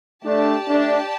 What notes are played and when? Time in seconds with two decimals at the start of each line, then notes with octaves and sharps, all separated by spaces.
0.25 A3 D4 G4 D5 A5
0.68 A3 D4